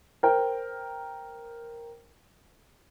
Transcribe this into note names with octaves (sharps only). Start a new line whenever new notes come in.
A#4 C5 G5